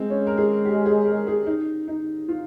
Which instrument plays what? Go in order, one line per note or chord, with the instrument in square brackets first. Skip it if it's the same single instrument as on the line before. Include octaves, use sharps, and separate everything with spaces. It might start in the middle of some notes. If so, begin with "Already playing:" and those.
Already playing: [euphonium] G#3 [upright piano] C4
[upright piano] C#4
A#4
G#4
G4
G#4
A#4
G#4
D#4
D#4
F4